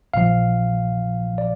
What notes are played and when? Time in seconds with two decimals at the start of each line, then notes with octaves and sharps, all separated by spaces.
0.14 A#1 A#2 F3 F5
1.38 D5